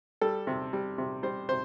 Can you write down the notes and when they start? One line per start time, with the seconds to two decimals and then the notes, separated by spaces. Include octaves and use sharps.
0.21 G3 A4
0.47 C3
0.73 G3
0.98 C3
1.23 G3 C5
1.49 C3 C5